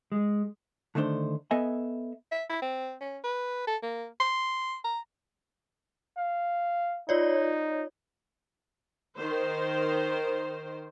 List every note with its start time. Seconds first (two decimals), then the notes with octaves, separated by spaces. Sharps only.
0.12 G#3
0.95 D3 D#3 A3 D4 C5
1.51 B3 A4 D#5 E5 G#5
2.32 E5
2.50 E4
2.62 C4
3.01 C#4
3.24 B4
3.67 A4
3.83 A#3
4.20 C6
4.84 A#5
6.17 F5
7.09 D#4 F4 C#5 D5
9.18 D#3 C5